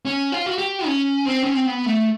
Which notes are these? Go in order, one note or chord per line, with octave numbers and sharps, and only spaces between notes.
C#4
F4
F#4
G4
C#4
C4
C#4
C4
B3
A3